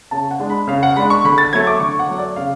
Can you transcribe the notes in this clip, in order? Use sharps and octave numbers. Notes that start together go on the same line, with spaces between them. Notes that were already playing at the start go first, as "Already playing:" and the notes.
C#3 A5
F#5
G#3 D4
B5
C#3 F5
F#5
G#3 D4 B5
C#6
D3 B5
A6
F#3 A3 G#6
D6
D3 C#6
F#5
F#3 A3
D5
C#3 F5